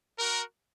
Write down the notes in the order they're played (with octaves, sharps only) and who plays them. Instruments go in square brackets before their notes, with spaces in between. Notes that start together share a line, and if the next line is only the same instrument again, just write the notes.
[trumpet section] F#4 A#4